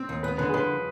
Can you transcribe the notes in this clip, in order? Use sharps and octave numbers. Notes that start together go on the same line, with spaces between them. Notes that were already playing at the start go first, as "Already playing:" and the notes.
Already playing: C4
D#2
B3 B4
D3 B4
G#4
F3 B4